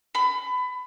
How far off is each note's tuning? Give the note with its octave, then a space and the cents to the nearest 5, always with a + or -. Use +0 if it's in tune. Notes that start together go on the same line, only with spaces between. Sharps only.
B5 +25